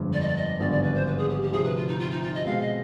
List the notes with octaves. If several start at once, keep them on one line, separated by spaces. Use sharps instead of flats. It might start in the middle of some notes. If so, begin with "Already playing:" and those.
Already playing: G1 F2 D3 F3 G#3
D5
D#5
D5
D#5
G#1 G2 D3 F3 B3 D5
D5
B4
C5
B4
G#4
G4
G4
D2 C3 F3 G#4
B4
F4
D#4
F4
D#4
F4
D#5
B2 G#3 C4 F5
D#5